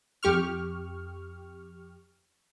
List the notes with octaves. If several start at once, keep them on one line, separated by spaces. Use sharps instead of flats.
F2 G4 C#6 F6